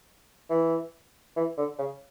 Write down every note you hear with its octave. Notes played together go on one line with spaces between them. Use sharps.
E3
E3
D3
C#3